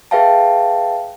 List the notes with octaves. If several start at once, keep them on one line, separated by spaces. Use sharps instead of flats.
G#4 B4 E5 F5 G5 A5